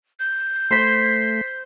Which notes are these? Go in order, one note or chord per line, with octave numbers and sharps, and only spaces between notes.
G6
A3 C5 C6 B6 C7